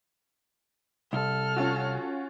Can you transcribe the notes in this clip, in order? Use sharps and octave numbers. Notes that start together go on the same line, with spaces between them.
C2 A4 F6
C#4 F4 F#4